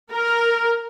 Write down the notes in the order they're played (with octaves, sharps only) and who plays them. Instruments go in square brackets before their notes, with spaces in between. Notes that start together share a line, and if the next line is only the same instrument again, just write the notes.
[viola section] A#4